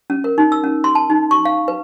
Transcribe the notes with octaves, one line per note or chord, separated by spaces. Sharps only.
C#4
A#4
D#4
E6
C#4
C6
A5
D#4
C#6
F5
B4